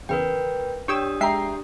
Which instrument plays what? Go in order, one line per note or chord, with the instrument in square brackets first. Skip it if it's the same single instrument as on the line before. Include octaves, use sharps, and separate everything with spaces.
[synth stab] E2 C#3 [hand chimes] A#4 B4 G5
[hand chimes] D4 G4 D#6 [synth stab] C#5 G5 E6
[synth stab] G#3 E5 C7 [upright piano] G5 A#5